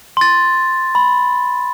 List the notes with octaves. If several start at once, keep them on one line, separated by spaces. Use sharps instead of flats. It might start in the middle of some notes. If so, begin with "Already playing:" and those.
C6 A6
B5